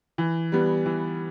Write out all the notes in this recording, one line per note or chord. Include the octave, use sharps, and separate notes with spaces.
E3
G3 B3
E3